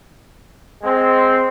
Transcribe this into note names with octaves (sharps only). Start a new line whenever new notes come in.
G#3 C4